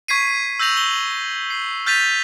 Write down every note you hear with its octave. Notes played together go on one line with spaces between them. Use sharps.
C#6 G#6 B6 C7 D#7
E6 G6 A#6 F7 F#7
F#7 G7
C7
F6 G6 A6 B6 D#7 F7